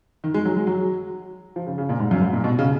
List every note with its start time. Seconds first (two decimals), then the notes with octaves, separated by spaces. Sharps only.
0.24 D#3
0.34 G#3
0.45 F#3
0.56 G#3
0.67 F#3
1.56 F3
1.66 C#3
1.78 C#3
1.89 A#2
1.99 G#2
2.11 F#2
2.22 G#2
2.33 A#2
2.44 B2
2.59 C#3